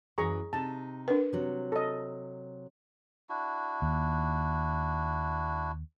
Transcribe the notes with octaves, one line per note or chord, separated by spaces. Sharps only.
F#2 E3 G#4 A#5 C#6
C3 D#4 A5
D4 A#4 B4
C3 F#3
A4 D#5
D4 E4 F#4
D#2